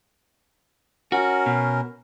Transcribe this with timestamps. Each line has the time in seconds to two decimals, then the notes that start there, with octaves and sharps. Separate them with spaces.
1.12 C#4 F#4 A#4
1.46 B2